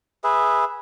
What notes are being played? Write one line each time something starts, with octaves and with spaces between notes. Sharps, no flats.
G#4 B4 E5